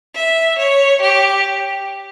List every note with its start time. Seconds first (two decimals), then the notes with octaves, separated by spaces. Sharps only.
0.16 E5
0.58 C#5
1.02 G4